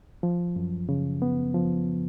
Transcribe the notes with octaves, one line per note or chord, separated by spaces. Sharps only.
F3
F#2
C#3
B3
F3